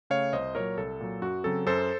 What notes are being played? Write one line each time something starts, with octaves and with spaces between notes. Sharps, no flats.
C#3 A3 C#5 F5
C2 C5 D#5
A#2 F#3 A#4 C#5
C2 A4
A#2 F#3
F#2 F#4
C#3 F#3 C4 A4
F#2 A4 C5